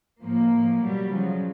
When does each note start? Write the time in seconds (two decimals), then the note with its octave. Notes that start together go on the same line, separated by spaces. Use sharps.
0.22 A2 F3 A#3
0.51 A2 F3
0.81 B2 F#3 G3
1.11 C#3 F3 F#3